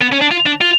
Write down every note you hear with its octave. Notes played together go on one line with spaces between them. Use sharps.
B3
C#4
D4
F4
D4
F4